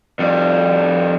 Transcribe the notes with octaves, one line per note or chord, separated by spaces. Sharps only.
F2 G3